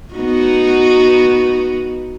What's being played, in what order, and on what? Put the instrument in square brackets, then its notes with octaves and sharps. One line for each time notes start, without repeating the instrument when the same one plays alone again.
[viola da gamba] B3 D#4 F#4